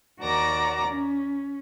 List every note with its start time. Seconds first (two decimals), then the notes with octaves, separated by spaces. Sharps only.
0.21 D#2 F#4 A#4 D5 A#5 D6
0.87 C#4